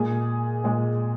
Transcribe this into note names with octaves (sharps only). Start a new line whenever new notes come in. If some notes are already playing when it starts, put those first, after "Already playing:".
Already playing: A#2 G#3 G#4
A#2 G#3